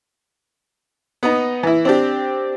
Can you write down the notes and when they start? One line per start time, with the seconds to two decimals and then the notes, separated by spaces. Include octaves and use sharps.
1.23 B3 D#4
1.63 E3 E4
1.85 C4 D4 G4